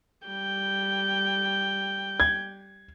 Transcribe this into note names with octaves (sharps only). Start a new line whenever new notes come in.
G3 G5
G#6